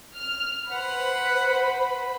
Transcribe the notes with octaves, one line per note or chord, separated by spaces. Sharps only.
F6
B4 C5 F#5 B5